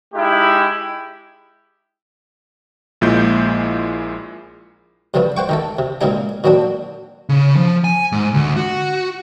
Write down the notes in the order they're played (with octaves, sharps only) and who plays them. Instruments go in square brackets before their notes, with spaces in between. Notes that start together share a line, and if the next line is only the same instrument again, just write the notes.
[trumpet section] G#3 D#4 E4 G4
[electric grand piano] A#1 A#2 G#3 E4 G6
[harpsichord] G2 C#3 F3 A3 B3
C5 F#5 G5 C#6
D#3 A3 A4
C3
A#2 C#3 G#3 C4 D#4 G#4
A#2 D#3 F#3 C4 D4
[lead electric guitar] C#3
F3
G#5
G#2
D2
F#4